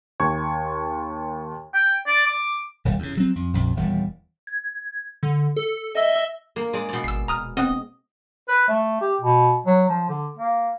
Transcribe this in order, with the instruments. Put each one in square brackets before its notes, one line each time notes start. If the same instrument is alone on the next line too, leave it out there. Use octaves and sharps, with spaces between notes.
[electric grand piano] D#2 C#6 G#6
[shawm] G5
D5
D6
[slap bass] E1 D#2 G3
E2 C#3
F#3 C4
F2
A#1 F2
D#1 E2 G3
[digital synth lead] G#6
D3
A4
[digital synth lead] D#5 [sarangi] E5
[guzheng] A#3
G#3 D5
B2 D5
[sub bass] G#1 [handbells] E6 C7
[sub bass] D#1 [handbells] A#5 D#6 F6
[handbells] B3 C4 [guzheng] D#5
[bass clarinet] B4
A3
G4
B2
F#3
F3
D3
A#3